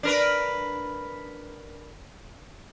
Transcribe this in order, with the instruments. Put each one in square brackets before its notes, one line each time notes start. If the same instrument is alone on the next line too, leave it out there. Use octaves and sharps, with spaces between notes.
[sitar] D4 A#4 B4